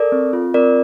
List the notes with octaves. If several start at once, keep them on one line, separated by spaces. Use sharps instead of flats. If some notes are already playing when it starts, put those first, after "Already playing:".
Already playing: A4 A#4 D5
C4
F4
C4 A#4 D5